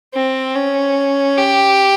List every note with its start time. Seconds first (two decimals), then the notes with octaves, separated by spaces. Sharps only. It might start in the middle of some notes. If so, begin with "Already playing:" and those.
0.14 C4
0.55 C#4
1.37 G4